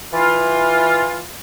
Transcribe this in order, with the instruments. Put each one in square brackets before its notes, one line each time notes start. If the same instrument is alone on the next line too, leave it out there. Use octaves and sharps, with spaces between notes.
[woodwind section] E3 F4